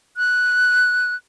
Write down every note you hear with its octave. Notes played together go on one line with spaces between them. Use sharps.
F#6